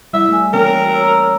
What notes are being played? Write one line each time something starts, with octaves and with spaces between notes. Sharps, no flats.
G3 E4 E5
A3 G#5 E6
E3 A#3 C#4 A#4 G5
C#5 A#5 E6